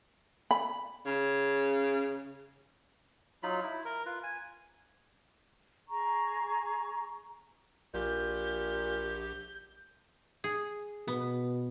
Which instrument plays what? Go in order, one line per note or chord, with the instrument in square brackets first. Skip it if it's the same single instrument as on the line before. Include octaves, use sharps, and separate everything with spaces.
[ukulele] B5
[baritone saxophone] C#3
[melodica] F#3 D#4 F4 B5
E4
A#4
F4 B4
G#5
[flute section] G#4 A#5 C#6
[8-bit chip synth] A#1 G4 [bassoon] A#2 [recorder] G6
[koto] G#4
[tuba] B2 [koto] B3